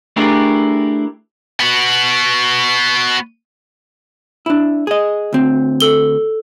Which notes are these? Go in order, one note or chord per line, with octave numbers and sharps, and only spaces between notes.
A3 D4 E4 G4 G#4 A#4
B3 F#4
D4 E4
G#4 D#5
D2 C4
A4 G7